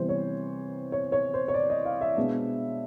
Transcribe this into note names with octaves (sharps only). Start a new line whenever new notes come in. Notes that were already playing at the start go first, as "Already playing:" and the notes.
Already playing: C3 E3 G3 B3 C5
C#5
C#5
C#5
C5
C#5
D5
D#5
F5
E5
B2 G#3 B3 D4